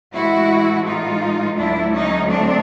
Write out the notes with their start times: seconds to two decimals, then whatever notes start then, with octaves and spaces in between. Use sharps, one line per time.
0.14 A2 E3 G#3 E4 F#4
0.86 D#4 F4
1.57 D2 D3 F#3 A3 D4 E4
1.93 C#4 D#4
2.29 C4 D4